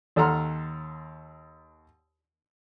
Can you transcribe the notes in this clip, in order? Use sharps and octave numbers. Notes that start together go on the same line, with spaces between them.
D#2 A4 F#5 A#5 C6 F6